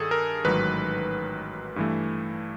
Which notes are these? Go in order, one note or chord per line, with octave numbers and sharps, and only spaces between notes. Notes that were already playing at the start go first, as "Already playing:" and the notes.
Already playing: G2 D#3 G#4 A4
A#4
A1 G#2 D#3 F#3 B4
G2 E3 A3